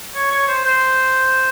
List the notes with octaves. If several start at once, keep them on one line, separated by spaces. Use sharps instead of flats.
C#5
C#5
C5
C5